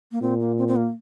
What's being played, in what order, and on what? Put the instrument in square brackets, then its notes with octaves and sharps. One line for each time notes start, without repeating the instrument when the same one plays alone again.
[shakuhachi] A#3
[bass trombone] A#2 [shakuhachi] C4
[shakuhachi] A#3
C4
C4
A#3